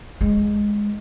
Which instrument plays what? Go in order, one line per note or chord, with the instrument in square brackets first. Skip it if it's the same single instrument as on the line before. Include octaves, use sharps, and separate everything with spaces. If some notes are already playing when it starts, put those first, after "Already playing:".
[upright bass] G#3